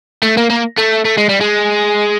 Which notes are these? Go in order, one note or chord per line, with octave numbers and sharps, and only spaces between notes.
A3
A#3
A#3
A3
A3
G#3
G3
G#3